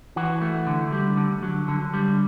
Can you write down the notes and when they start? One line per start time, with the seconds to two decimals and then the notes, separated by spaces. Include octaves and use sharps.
0.16 E3 F#4
0.41 A3
0.67 D3
0.92 G3
1.17 D3
1.43 F#3
1.68 D3
1.94 G3